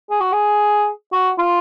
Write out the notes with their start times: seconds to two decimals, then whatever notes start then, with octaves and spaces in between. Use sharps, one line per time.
0.10 G#4
0.21 F#4
0.32 G#4
1.12 F#4
1.39 F4